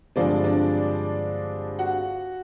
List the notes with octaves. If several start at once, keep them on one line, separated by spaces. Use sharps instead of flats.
G2 D3 F3 G#3 C4 D4 D5
D4 D5
F#4 F#5